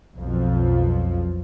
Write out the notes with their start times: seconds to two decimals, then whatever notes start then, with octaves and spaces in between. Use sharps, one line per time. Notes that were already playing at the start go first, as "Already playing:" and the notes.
0.15 B1 F2 F3